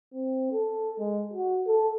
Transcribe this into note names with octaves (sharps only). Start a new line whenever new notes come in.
C4
A4
G#3
F#4
A4